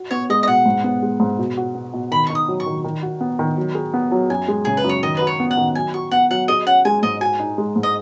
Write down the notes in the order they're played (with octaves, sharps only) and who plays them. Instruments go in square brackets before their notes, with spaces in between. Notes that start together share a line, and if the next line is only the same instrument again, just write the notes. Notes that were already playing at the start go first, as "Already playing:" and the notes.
Already playing: [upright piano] F#4
[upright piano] B3 [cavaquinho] C#5
[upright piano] G#3 [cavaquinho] D#5
[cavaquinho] D#5
[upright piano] B2 [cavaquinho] F#5
[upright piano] G#2
B3
G#3
G#2
B2
F#4
B3
B2
[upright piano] D#3 [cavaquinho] B5
[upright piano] D#4 [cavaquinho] C#6
[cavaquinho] D#6
[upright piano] F#3
[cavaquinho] C#6
[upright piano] D#3
D#3
F#4
B3
D#3
F#3
G#4
B3
F#3
[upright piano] F#2 [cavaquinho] G#5
[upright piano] G#3
[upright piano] C#3 [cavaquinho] G#4
[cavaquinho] B4
[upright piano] F#2
[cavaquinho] C#5
[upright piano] D#3 [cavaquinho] D#5
[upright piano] F#4 [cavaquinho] B4
[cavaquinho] C#5
[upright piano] B3
[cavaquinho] F#5
[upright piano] D#3
[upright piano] F#3 [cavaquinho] G#5
[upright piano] F#4 [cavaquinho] C#6
[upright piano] B3 [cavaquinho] F#5
[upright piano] F#3 [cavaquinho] F#5
[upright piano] G#4 [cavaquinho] D#5
[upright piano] C#4 [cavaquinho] F#5
[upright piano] G#3 [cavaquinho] G#5
[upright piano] G#2 [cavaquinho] D#5
[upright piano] F#4 [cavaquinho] G#5
[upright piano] D#4
G#3
G#2
[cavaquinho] D#5